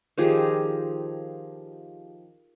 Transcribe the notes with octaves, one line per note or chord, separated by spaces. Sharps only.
D#3 F3 G4 G#4